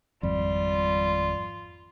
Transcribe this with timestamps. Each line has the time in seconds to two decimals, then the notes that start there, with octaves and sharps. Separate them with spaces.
0.23 G#1 F2 G3 F4